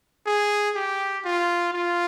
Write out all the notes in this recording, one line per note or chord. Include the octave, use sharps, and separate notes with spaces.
G#4
G4
F4
F4